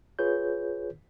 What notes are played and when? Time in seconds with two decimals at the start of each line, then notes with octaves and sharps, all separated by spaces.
0.19 F4 G#4 B4 C#5 G6